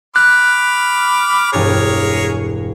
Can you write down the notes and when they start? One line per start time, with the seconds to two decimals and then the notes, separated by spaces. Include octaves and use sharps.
0.16 B5 D6 F6 F#6 A#6
1.53 E1 G2 G#4 A#4 C#5 A6